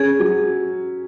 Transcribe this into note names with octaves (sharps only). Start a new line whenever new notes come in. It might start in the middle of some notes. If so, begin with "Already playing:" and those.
Already playing: C#4 G#4
F#3